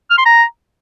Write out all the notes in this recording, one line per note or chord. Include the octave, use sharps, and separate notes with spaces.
F6
C6
A#5